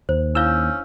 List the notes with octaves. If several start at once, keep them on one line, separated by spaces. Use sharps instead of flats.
D#2 C5
C#4 D4 E4 F5 E6 G6